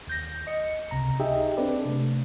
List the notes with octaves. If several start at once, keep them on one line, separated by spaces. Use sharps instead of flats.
D#2 G6 A#6
D#5 C#7
C#2 C3 A#5
D#4 G4 G#4 D#5 E5 G5
C4 D4 A4 B4 D5
C3 A3